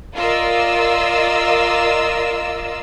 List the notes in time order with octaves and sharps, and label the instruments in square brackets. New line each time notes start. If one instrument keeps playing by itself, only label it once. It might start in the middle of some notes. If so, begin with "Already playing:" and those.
[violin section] F4 A#4 D5 D#5 E6